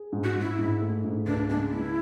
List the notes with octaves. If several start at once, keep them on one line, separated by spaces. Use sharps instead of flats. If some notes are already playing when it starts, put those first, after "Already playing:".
Already playing: G#4
G#2
F#4
G#2
E4
G#2
A3
G#2
C#2 D4
G#3 D4
G#3 E4